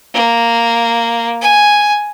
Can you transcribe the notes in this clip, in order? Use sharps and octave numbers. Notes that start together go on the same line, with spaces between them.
A#3
G#5